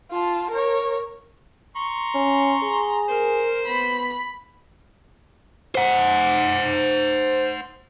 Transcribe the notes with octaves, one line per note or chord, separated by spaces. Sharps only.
F4 A5
A#4 C#5
A#5 C6 C#6
C#4
G#4
A#4 C5
B3 B5
C5 F#5